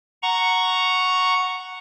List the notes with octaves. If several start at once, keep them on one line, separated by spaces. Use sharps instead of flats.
F#5 A#5 C#6